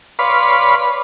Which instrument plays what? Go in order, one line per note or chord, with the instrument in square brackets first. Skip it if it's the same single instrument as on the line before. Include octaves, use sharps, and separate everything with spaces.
[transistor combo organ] B4 C#5 D5 F5 B5 C6